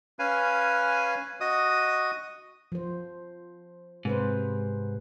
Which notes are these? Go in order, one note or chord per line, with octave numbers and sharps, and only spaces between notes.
C#4 B4 F5 G#5
F#4 D#5 D#6
F3 C5
G#2 C3 B4 C5